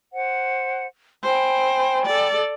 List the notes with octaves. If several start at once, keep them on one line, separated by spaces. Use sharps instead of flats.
C5 F#5
C5 G5 G#5 B5
A4 D5